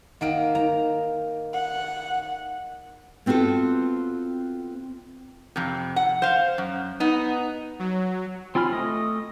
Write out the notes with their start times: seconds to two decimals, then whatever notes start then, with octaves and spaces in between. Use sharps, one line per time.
0.21 D#3 A#3 A#4 F#5 D7
0.55 D#3 A#5
1.54 F#5
3.26 B3 C4 F4 F#4 A4
5.56 F2 C3
5.96 F#5
6.22 C5 F5
6.58 F#2
7.00 B3 D#4
7.79 F#3
8.55 C4 F4 G#5 B5 F6
8.71 A3 D#5